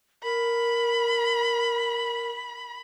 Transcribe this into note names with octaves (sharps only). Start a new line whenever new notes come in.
A#4 B5